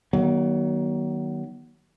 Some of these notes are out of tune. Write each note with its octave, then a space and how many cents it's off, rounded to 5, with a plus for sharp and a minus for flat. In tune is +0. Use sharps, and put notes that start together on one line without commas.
D#3 +0 F#3 +30 B3 -45